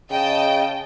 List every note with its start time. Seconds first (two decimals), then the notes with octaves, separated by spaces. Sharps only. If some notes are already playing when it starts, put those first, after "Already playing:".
0.11 C#3 D#5 G5 A5